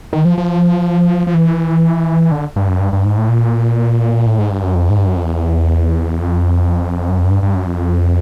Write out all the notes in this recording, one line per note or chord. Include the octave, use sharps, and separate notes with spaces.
D#3
F3
F3
F3
E3
D3
G2
F#2
G2
G2
G#2
A2
A#2
A2
G#2
G2
F#2
F2
G#2
G2
F#2
F2
E2
F2
F#2
F2
F#2
G2
G2
F#2
F2